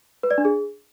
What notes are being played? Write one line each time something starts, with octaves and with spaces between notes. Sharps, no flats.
B4
D5
D4
G#4